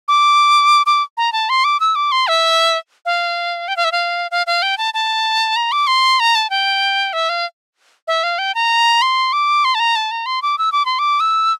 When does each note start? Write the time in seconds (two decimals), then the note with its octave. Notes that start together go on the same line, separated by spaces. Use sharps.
0.08 D6
0.86 D6
1.17 A#5
1.33 A5
1.49 C6
1.64 D6
1.80 E6
1.95 D6
2.12 C6
2.28 E5
3.06 F5
3.68 G5
3.77 F5
3.84 E5
3.92 F5
4.31 F5
4.47 F5
4.62 G5
4.78 A5
4.94 A5
5.56 A#5
5.72 D6
5.87 C6
6.20 A#5
6.35 A5
6.50 G5
7.13 E5
7.29 F5
8.08 E5
8.23 F5
8.39 G5
8.55 A#5
9.02 C6
9.33 D6
9.65 C6
9.75 A5
9.80 A#5
9.96 A5
10.11 A#5
10.26 C6
10.42 D6
10.58 E6
10.72 D6
10.86 C6
10.99 D6
11.20 E6